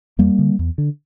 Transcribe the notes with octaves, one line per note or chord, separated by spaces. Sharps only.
E2 G3 A#3
D3
E2
D3